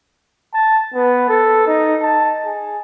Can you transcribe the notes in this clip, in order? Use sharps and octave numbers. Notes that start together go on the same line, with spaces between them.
A5
B3
A4
D#4
A5
G#4